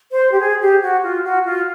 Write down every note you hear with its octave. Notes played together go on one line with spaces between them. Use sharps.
C5
G4
G#4
G4
F#4
F4
F#4
F4